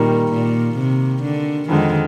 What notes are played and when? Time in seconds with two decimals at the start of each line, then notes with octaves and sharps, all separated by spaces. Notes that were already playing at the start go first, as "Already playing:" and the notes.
Already playing: A#2 D#3 G3 A#3
0.32 A#2
0.78 C3
1.22 D3
1.69 F2 D3 D#3 G#3